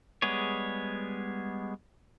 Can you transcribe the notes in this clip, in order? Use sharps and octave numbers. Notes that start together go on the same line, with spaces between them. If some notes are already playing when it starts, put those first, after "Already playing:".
G3 G#3 B3 G#4 C#5